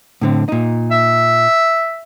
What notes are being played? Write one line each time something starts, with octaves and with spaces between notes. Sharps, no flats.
A2 D3 C4
A#2 D#4
E5